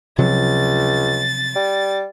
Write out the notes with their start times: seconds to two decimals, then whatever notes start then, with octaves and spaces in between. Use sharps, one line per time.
0.18 C#2 C3 F3 F#3 A6
1.55 G3